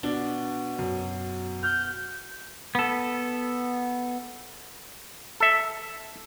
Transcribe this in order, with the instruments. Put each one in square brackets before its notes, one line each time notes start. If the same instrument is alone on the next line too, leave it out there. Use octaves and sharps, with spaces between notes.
[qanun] B2 [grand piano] D4 D5
[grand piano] F#2
[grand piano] F6 [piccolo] G6
[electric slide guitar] B3 A4
[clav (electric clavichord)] A4 E5